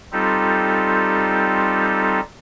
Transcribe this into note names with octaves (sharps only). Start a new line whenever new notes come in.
G3 C4 D#4 F4 G4 A4